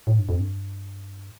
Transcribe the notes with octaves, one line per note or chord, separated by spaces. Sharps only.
A2
G2
F2
G2